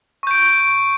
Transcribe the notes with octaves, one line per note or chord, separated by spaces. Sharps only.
C#6 G6 D7